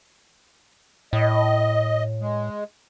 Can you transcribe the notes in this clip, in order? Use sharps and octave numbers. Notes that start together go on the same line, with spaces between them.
A2 D#5
G#3